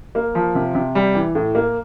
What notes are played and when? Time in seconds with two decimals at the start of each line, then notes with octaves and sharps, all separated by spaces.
0.15 A#3
0.35 F3
0.55 C3
0.75 C3
0.95 G3
1.15 E3
1.35 A2
1.55 A#3